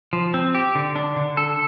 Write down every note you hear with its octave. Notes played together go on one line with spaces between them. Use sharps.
F3
C4
G4
D3
D4
D3
A4